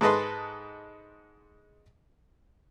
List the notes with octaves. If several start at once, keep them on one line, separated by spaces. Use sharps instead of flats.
G#2 G#3 A4 B4 D#5 C6